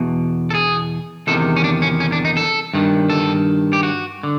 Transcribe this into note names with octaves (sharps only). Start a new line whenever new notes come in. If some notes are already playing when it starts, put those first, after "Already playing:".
Already playing: E2 B2
A4
G#4
E2 C3 D#3 A4
C#4
D4
C#4
C#4
D4
D#4
A4
G2 D#3
A4
G4
F#4
D3